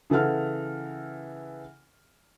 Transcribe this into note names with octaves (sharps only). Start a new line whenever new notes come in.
C#3 E3 A4 F#5 F6